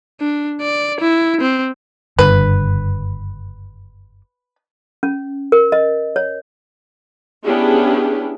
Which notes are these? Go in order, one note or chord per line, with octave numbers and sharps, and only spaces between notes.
D4
D5
E4
C4
F#1 G2 D3 B4
C#4
A#4
D#5
C#5
B3 C#4 D4 E4 G4 G#4